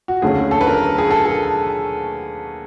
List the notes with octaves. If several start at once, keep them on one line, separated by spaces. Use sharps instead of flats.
F#4
D#2 D3 F#3 A3 C#4 G#4
A4
B4
A#4
G#4
A4
A4